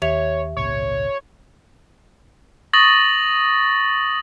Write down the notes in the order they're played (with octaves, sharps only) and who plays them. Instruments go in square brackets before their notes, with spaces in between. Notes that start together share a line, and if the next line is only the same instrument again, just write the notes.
[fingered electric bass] D#2 [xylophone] G4 E5 F7 [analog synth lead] C#5
[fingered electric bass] G#1 C#2 A#2 [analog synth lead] C#5
[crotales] C#6 D#6 A6 A#6 F#7